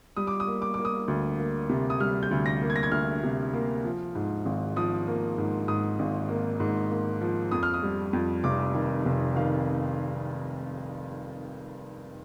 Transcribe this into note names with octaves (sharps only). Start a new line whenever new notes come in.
G3 D#6
D6
D#6
A#3
D6
A#3 D6
D#6
D2
A#3
C3
D#6
G3 F6
G6
D2
A#6
A#3
G#6
A#6
G#6
D2 F6
C3
A#3
F3
G#2
G#1
F3 D#6
A#3
G#2
G#2 D#6
G#1
A#3
G#2
A#3
F3
F2 D#6
F6
D#6
G3
F2
F1 D6
D#3
F1
D#3 F5